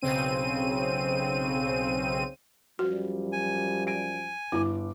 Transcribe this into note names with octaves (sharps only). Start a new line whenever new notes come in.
B1 C#3 C4 D#7
F#2 F3 G3 F#4
G#5
G#5 D7
G1 E4 D6